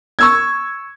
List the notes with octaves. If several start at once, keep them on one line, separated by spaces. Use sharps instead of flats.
C#6 E6 G#6